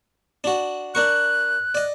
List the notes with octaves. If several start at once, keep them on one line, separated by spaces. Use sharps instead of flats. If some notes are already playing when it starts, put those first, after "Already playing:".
D4 F#4
D4 A#4 C#6 F#6
D5 D#5